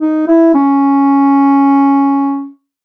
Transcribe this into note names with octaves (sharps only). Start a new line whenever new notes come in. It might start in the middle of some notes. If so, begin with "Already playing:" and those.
D#4
E4
C#4